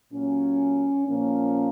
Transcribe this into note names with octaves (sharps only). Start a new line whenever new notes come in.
A#2 F#3 A#3 C#4
A#2 F3 A#3 C#4